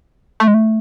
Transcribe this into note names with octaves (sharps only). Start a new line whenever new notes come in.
A3
G#3
A3